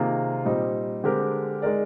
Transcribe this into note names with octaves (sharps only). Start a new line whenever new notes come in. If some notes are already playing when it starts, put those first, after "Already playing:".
Already playing: C3 D#3 A#3 F4 G#4
A#2 G3 C4 D#4
D3 G#3 C4 G4 A#4
G#3 D#4 A#4 D5